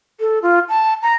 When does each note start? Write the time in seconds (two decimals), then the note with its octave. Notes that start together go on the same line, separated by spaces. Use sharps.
0.20 A4
0.42 F4
0.69 A5
1.02 A#5